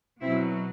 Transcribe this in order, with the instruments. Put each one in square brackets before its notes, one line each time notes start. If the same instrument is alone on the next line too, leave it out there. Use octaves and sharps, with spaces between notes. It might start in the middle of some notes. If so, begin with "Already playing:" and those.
[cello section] B2 F#3 C4 E4